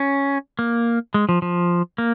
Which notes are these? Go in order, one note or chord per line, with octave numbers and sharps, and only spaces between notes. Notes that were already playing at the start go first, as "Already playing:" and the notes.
Already playing: C#4
A#3
G#3
F3
F3
A#3